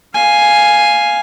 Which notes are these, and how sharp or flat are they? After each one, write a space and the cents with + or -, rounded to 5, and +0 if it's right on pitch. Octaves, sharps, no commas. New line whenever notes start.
F5 +0 G#5 +0